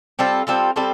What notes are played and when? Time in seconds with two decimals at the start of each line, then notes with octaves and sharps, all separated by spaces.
0.19 G3 C4 F4 A4
0.47 G3 C4 F4 A4
0.76 G3 C4 F4 A4